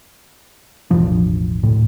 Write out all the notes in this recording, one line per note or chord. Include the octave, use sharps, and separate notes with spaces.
E1 A1 F3 D4
D2 A2